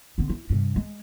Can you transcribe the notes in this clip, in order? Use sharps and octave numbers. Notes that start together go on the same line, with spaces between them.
D3 C4
E4
G2 C3
G#3